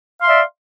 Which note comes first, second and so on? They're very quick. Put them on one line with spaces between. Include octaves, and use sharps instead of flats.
F5 C6 E5 D5